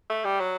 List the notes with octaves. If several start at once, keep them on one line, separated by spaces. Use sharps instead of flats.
A3
G3
F#3